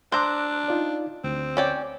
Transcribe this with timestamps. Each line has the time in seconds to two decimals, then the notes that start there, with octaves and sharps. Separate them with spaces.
0.12 D4 C5 A#5 D6 E6 F#6
0.68 D#4 F4 D5
1.24 D2 C4
1.57 C#4 D5 G5